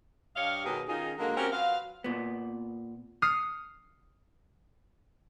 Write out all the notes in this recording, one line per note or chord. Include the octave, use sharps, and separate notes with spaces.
G2 G4 C#5 D#5 F5
B2 D#3 F#3 B3 G4 G#4
D#3 C#4 D#4 F4 G#4
D3 F#3 G#3 A#3
C4 C#4 F#4 G4 A#4
F#3 F4 B4 F5
A#2 B3
D#6 F6 C7 C#7